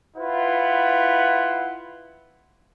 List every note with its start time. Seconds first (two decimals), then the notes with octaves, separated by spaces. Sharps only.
0.17 E4 F4 B4 F#5